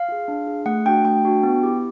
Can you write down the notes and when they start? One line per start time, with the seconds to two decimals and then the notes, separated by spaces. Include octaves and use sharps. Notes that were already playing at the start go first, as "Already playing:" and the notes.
Already playing: F5
0.08 F4 G#4
0.28 D4
0.46 F4 G#4
0.66 A3 F#5
0.85 D4 F#4 G5
1.05 A3 G5
1.25 D4 F#4
1.43 B3
1.63 E4 G4